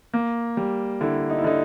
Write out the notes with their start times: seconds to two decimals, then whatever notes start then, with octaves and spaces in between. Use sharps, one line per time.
0.13 A#3
0.57 G3
1.01 D3 E4
1.30 D#4
1.38 E4
1.44 D3 D#4